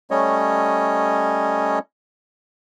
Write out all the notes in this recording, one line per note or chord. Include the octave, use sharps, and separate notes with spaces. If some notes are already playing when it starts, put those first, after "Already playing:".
G3 A3 C#4 C#5 D#5